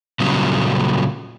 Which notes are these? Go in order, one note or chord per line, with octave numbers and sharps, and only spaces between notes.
A#2 C#3 F#3 G3